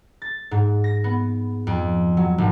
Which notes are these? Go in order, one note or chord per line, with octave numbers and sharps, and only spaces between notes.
A6
G#2
A#6
B3
F2
F#3
G#1